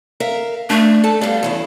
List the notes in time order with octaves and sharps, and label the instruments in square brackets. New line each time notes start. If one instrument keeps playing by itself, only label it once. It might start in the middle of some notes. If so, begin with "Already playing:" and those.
[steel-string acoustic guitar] A#4 E5 F5
[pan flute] A3 [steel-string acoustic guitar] D4
[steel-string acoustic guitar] A4 A5
[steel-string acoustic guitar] G3 B3 D4 [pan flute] F5
[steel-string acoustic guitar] E2 C#3 E4